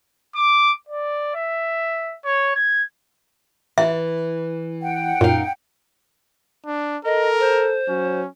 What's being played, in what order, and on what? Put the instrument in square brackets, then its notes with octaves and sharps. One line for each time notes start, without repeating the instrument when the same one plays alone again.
[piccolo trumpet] D6
D5
E5
C#5
G#6
[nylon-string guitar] E3 [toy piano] E5
[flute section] F#5 G5
[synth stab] F#2 A#2 [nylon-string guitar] D#4 F5
[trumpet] D4
[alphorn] A4 [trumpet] A#4 [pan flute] D#5
[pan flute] C5
[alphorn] F#3 [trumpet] C#4